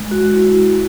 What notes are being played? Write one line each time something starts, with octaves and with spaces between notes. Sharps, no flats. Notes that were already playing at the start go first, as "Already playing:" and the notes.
Already playing: G#3
F#4
E4